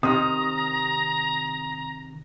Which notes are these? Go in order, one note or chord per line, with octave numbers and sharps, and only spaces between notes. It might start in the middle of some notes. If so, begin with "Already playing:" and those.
C3 D#3 A#5 D#6